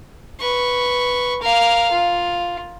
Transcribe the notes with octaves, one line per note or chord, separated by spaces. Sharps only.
B4 C#6
A#4 F5
F4